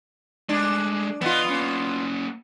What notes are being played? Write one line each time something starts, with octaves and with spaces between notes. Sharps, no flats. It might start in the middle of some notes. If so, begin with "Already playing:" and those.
G#3 A3 D4
E3 B3 F4 D#5
A#3 C#4